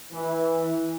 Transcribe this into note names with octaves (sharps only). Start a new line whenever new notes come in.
E3